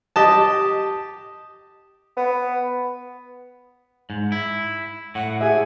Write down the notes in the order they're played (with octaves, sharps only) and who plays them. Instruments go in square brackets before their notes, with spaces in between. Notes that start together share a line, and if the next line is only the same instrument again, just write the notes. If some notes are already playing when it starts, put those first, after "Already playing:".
[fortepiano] G4 D#5 A5
[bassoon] B3
[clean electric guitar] G#2
E4
[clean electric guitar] A2 [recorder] F#5
[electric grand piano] G4 G#4 E5 [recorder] G#5